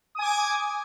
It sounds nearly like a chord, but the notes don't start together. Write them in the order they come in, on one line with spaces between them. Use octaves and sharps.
D#6 G#5 D6 G#6